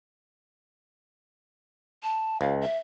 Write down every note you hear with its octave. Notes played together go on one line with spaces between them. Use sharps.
A5
C#2 F5
E5